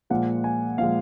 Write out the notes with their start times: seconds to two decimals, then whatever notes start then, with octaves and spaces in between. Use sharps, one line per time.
0.10 A#2 F3 G#3 F#5
0.44 G#5
0.78 A#2 F3 G#3 F5